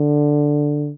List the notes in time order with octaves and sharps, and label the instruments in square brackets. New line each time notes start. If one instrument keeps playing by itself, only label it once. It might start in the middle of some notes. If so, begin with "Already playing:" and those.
Already playing: [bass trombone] D3